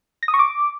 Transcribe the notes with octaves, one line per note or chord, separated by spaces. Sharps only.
A#6
D#6
C#6
D6